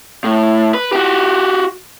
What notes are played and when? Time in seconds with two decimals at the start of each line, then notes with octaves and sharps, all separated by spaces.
0.24 A2
0.74 B4
0.93 F#4 G4